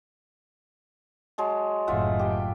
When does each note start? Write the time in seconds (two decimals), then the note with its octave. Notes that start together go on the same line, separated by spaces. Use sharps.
1.38 F#3 G#3 A5
1.87 F#1 A2 F4 E5 F#5
2.19 G4 G5